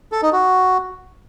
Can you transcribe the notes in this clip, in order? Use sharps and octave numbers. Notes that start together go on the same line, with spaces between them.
A4
D#4
F#4